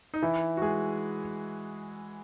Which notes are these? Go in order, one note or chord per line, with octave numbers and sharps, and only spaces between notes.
D#4
E3 E4
F#4
G#3 G#4